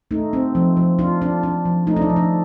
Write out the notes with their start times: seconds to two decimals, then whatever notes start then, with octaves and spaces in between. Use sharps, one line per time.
0.11 A3 D#4
0.33 C4
0.55 F3
0.77 F3
0.99 D4 F4
1.22 D4
1.43 D4
1.65 F3
1.87 A3 D#4
1.96 D4
2.02 D#4
2.09 F3
2.16 D4